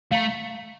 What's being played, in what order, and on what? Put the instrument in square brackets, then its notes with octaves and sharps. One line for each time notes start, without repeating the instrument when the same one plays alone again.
[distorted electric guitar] A3 [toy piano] F5 A#5